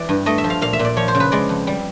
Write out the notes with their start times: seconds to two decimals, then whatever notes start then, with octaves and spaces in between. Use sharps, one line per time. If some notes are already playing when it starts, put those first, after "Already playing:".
Already playing: E3 D5
0.09 G2
0.26 A3 D#5
0.38 E5
0.44 F3
0.50 F5
0.62 A#2 F5
0.73 E5
0.79 A#2
0.85 D5
0.97 F3 C#5
1.08 C5
1.15 C#3
1.20 B4
1.32 G#3 D5
1.49 F2
1.67 G3